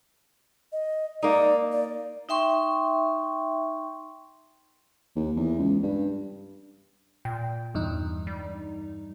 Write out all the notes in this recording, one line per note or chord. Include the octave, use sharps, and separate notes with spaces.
D#5
A#3 D#4 D5
D5
D#4 E5 G5 C6 C#6
D#2
E2
C#2
G2
A#2 G5
E2 G2 D#4
G3